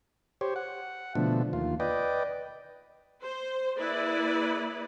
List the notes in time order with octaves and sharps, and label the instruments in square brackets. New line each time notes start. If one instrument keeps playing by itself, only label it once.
[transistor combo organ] G4 C5 C#5
F#5
B2 D3 F3 A3
D#2 F4
B4 D5 D#5 G5
[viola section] C5
A#3 E4 G#4 B4 D5